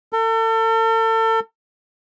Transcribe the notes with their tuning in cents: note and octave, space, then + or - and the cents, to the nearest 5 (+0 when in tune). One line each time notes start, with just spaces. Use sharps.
A4 +40